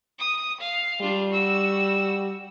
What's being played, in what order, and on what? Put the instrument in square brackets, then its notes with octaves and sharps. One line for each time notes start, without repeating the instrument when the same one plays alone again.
[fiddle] D#6
F5
[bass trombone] G3 [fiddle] D4 F4
[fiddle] F#4 E6